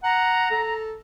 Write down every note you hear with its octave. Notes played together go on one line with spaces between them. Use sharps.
F#5 A#5
A4